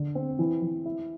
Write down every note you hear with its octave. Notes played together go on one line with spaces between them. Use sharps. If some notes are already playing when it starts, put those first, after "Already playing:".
Already playing: D3
C4
E3
E3
E4